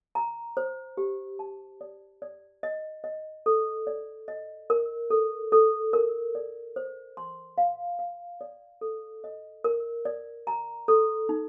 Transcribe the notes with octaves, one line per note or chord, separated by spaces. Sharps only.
A#5
C5
G4
A5
D5
D5
D#5
D#5
A4
D5
D#5
A#4
A4
A4
A#4
D5
C5
C6
F5
F5
D5
A4
D#5
A#4
D5
A#5
A4
D#4